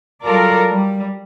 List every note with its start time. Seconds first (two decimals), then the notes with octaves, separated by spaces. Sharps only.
0.24 F#3 G3 F4 A4 A#4 D5
0.65 G3